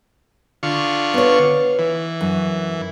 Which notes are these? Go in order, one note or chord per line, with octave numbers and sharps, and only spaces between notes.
D3 F4 C#6
B3 C#5
E3
F#2